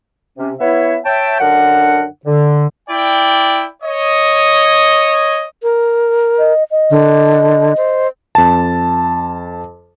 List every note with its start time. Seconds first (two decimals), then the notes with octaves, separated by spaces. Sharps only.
0.38 C3 C#4
0.60 B3 E4 C#5 E5
1.05 C#5 E5 G5 A5
1.40 F#2 D3 D4 A#4 F#5
2.26 D3
2.89 E4 D5 G5
3.83 C#5 D#5
5.63 A#4
6.39 D#5
6.71 D#5
6.90 D3
7.77 C5
8.35 F2 A5